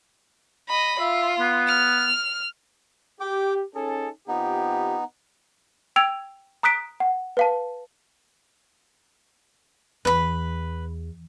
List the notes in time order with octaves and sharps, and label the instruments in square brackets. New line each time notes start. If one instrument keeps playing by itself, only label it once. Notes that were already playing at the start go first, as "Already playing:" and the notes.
[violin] D#5 B5
[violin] F4 [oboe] E5
[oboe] B3
[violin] F6
[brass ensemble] G4 [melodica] G5 D6
[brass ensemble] C#4 D#4 A4 [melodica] G#4
[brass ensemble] C3 F4 G4 [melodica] B3 D#4
[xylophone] G5 E6 G#6 D7 F7
A#5 D#6 F#6 B6 D7
F#5
B4 F5 A5
[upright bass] E2 [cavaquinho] B4 B5